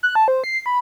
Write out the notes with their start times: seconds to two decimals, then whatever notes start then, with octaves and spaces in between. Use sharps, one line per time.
0.03 F#6
0.15 A5
0.28 C5
0.44 C7
0.66 B5